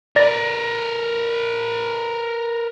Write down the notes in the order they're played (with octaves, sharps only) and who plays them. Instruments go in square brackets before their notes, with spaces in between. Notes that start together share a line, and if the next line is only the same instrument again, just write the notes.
[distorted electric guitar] A#4 B4 [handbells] D5 A#6